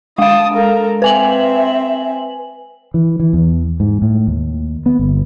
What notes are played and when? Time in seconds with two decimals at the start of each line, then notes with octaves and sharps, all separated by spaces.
0.18 G#3 F5 A5 D#6
0.54 A4 A#4
1.02 C4 B4 E5 G#5 F#7
2.94 E3
3.20 E3
3.33 E2
3.80 G#2
4.02 A2
4.27 D#2
4.86 B3
4.99 G1